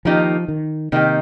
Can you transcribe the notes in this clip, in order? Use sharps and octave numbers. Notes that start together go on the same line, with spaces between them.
D#3 F3 A#3 D#4 G4
D#3
C3 D#3 A#3 D#4 G4